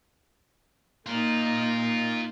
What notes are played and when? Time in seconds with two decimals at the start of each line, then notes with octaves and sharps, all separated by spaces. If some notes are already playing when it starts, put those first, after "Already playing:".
1.06 A#3 D#4 F4 A#4